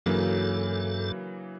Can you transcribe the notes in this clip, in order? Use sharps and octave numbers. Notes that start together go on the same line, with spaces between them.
G2 C#3 E3 F#3 A#3 D4 A4 A#4